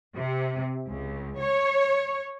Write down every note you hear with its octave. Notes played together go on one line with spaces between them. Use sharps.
C3
C#2
C#5